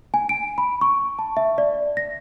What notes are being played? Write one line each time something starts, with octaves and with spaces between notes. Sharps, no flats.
G#5
D7
B5
C#6
A5
E5
D5
A#6